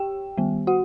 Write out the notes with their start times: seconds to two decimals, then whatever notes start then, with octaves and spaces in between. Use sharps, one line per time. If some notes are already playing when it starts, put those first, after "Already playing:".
Already playing: G4 G5
0.38 D#3 G3 B3
0.67 F#4 F#5